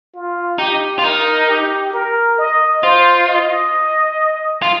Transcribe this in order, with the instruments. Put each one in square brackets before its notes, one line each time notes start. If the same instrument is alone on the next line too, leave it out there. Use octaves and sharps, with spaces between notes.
[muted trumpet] F4
[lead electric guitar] D#4 [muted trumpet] G4
[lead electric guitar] F4
[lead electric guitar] D#4 [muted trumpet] A#4
[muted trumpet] G4
A#4
D#5
[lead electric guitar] F4 [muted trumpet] C5
[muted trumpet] D#5
[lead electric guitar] F4